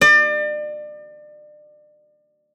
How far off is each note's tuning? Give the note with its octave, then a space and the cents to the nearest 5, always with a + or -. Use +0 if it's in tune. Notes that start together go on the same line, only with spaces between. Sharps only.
D5 +35